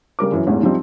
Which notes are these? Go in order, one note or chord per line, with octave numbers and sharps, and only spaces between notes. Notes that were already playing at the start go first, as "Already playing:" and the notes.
C#3 G3 A#4 D6
F#2 E3
A1 E2 G#2
F3 G3 C4 D#4